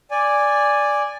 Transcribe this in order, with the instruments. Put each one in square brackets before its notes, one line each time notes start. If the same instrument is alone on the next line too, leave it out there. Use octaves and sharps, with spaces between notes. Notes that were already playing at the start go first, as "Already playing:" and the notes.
[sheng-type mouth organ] D5 G#5